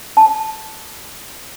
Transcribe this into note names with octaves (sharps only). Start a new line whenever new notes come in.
A5